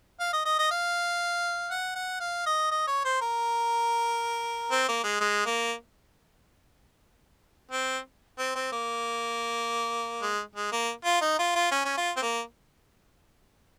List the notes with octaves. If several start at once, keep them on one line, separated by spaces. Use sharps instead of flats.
F5
D#5
D#5
D#5
F5
F#5
F#5
F5
D#5
D#5
C#5
C5
A#4
C4
A#3
G#3
G#3
A#3
C4
C4
C4
A#3
G#3
G#3
A#3
F4
D#4
F4
F4
C#4
C#4
F4
C4
A#3